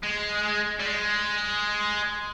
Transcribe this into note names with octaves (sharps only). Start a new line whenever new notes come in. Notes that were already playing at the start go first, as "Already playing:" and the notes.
G#3
G3
G#3